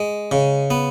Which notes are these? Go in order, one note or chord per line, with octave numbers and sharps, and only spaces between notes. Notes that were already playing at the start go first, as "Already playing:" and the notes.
Already playing: G#3
C#3
B3